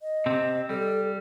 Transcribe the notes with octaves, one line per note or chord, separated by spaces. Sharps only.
D#5
C3 C4
G3 A4